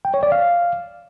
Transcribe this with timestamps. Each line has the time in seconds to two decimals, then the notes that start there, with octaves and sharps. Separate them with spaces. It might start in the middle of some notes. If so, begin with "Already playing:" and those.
0.05 G5
0.14 C#5
0.23 D5
0.32 F5